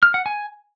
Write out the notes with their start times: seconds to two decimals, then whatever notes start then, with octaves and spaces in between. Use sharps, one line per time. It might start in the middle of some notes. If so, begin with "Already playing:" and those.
0.03 F6
0.14 F#5
0.26 G#5